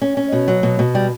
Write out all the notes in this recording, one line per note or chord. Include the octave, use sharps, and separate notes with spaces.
C#4
C#4
B2
F#3
B2
B2
G3